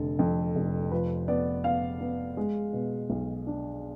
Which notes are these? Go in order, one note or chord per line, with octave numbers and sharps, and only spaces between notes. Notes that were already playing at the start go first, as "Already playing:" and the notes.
Already playing: F1 D3 A4
F2
F1
F3 B4
B3 D5
B3 F5
B3
G#3
B2
B1
D4